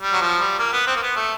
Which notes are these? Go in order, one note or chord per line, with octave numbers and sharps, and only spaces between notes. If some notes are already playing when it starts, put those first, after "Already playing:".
G3
F#3
F3
G3
A#3
B3
C4
A#3
B3
A3